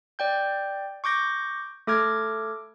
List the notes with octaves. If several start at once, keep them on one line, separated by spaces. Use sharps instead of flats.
D5 G5 G6
C#6 D6 G6 A#6
A3 A4 D6 F6 G#6